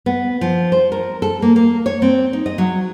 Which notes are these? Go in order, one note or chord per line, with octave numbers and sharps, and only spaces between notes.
B3
F3
C5
A#4
A4
A#3
A#3
C#5
C4
D#4
D#5
F#3